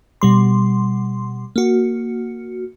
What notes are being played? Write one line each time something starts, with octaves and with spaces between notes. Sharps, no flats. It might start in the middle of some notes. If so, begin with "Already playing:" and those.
B2 G3 C6
A#3 F#4